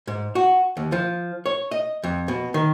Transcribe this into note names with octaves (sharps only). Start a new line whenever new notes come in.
G#2
F#4
D#2
F3
C#5
D#5
F2
B2
D#3